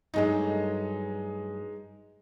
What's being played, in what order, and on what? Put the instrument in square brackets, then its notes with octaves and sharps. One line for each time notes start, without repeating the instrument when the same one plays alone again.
[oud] G2 F#3 A3 [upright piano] G#3 D#4